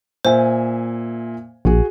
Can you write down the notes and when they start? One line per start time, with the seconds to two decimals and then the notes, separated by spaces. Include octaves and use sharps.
0.25 A#2 C5 E5 G#5
1.65 A#1 F#4 G#4